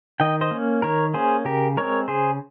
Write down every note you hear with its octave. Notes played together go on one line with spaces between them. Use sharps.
D#3 D#5 G5
C5 D#5
A#3 C#4
D#3 A#4 C#5
A#3 C#4 G#4 C5
C#3 G4 A#4
G#3 C4 A#4 C#5
C#3 G#4 C5